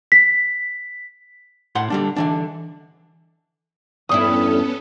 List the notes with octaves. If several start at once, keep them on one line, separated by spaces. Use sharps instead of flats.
B6
A2 F#5 C6
D3 G3 D4
D3 E3 D4
E2 G2 B3 C#4 E4 A4 D#6